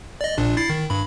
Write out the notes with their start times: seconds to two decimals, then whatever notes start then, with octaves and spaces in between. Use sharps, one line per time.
0.21 D5 D#5
0.38 A#1 A#2 D4
0.57 E4 A6 C7
0.70 D#3
0.90 G2 B5